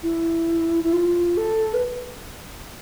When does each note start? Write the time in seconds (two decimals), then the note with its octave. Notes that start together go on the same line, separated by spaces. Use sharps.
0.03 E4
0.84 E4
0.93 F4
1.37 A4
1.74 B4